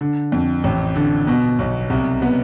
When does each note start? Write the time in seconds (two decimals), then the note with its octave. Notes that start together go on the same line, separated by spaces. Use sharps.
0.01 D3
0.32 F2
0.64 A1
0.96 D3
1.27 B2
1.59 B1
1.90 C2
2.22 B3